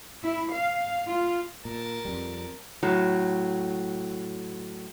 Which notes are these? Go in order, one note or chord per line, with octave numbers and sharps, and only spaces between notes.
E4
F5
F4
A#2 A#4 A5
F2 G3
A2 F#3